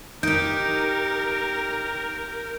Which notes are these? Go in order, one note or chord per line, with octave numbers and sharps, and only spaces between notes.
D#4 G4 A#4 G6 D7